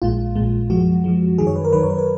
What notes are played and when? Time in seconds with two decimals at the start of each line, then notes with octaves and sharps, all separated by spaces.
0.02 A#1 A#2 G#3 F4
0.35 A#1 A#2 G#3
0.70 F#2 F3 G#3 F#4
1.04 F#2 F3 G#3
1.38 F#2 D#3 F#3 G#4
1.47 C#5
1.56 B4
1.65 A#4
1.73 F#2 D#3 F#3 B4
1.83 C#5
1.90 B4
1.98 A#4